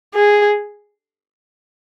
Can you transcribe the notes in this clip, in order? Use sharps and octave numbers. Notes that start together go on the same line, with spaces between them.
G#4